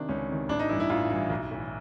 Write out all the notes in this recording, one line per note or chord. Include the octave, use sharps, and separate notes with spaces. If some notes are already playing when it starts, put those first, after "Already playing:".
Already playing: C3 D#3 D4
C#2 C#4
C3 D#3
A1 D4
D#4
G2 E3 E4
E4
A1 F4
G2 E3 E4
B1
A2 E3